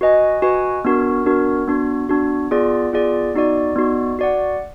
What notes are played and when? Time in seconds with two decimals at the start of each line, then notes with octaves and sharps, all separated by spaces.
0.01 F#4 B4 D#5 G#5
0.42 F#4 B4 D#5 G#5
0.85 B3 D4 F#4 A#4
1.26 B3 D4 F#4 A#4
1.68 B3 D4 F#4
2.09 B3 D4 F#4
2.51 B3 F4 G#4 D5
2.93 B3 F4 G#4 D5
3.34 B3 D#4 F#4 D5
3.76 B3 D#4 F#4 D5
4.19 F#4 D5 F#5